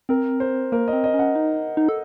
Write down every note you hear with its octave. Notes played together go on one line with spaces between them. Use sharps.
C4 A#4
C5
A#3 A#4
D#5
C4
D#5
C#4
F#5
D#4
D#4
A4